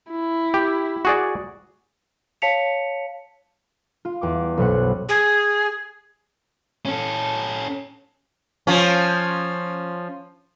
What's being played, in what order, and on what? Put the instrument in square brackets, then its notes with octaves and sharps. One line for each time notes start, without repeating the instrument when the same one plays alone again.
[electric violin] E4
[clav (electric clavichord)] G4
F#4 G#4 D5
[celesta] C#5 F5 A5 B6 C#7 F7
[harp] F4
E2 G5 D6
B1 F#2 B2 B3 C5 F#5
[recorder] G#4
[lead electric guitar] C#4 A4
[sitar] F3 C#4